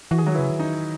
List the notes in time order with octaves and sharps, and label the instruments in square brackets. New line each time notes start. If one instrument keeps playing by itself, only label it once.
[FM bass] E3 [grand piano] F#4
[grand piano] G#4
[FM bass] D#3 [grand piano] F#3 F#4
[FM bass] C#3 [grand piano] E3 E4
[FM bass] D#3
[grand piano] D#4